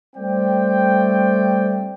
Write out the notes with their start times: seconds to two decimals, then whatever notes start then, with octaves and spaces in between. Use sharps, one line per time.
0.16 G3 A3 C4 D5 G5